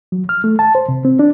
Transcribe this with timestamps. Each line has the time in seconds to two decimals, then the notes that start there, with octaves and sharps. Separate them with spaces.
0.12 F#3
0.29 F6
0.44 A3
0.59 A5
0.75 C5
0.89 C3
1.05 C4
1.19 D4